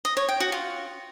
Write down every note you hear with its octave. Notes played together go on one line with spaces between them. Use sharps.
D#5
C#5
G5
F#4
F4